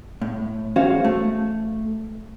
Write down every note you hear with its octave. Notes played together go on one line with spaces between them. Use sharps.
A2
E2 C#4 F#4 C5 F5
A3